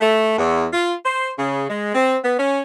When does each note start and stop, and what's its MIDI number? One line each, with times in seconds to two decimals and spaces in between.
0.01 0.34 57
0.39 0.65 40
0.73 0.94 65
1.04 1.30 72
1.38 1.65 49
1.69 1.91 56
1.95 2.16 60
2.23 2.37 59
2.39 2.62 61